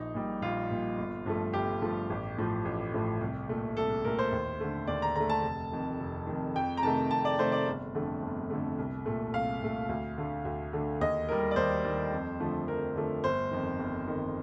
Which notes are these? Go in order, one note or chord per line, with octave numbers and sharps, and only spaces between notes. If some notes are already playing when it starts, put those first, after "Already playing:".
Already playing: A#1 D#4
A#2 G3
A#1 F4
A#2 G3
G1
G2 F3 A3
G1 G4
G2 F3 A3
A1
A2 F3 A3
A1
A2 F3 A3
C2
A#2 A3
C2 A4
A#2 A3 A#4
C5
D#2
D3 A3
D#2 D5
A#5
D3 A3 A#5
A5
F1
F2 D#3
F1
F2 D#3
F2 G5
A#5
C3 D#3 A3 A5
F2 A5
D5
C3 D#3 A3 C5
D5
G1
F2 D3 A3
G1
F2 D3 A3
C2
A#2 A3
C2 F5
A#2 A3
D2
D3 A3
D2
D3 A3
D#2 D#5
D#3 G3 A#4
D5
D#2 C5
D#3 G3
F2
D3 F3 A3
F2 A#4
D3 F3 A3
G1 C5
F2 D#3
G1
F2 D#3